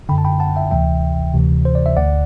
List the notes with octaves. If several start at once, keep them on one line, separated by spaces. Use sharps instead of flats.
F#2 D3 G5 B5
A5
G5 B5
F#5 A5
E5 G5
D2 C3 E3 E5 G5
D2 C3 E3
C5
D5
E5
D2 D3 D5 F#5